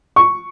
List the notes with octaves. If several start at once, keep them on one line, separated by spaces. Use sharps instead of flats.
C#6